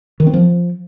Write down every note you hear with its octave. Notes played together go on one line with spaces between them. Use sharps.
D#3
C4
F3